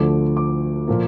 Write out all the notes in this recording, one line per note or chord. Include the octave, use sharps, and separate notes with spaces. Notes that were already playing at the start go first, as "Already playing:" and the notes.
Already playing: D2 D3 F3 A3 D6
D6
A#2 F3 A#3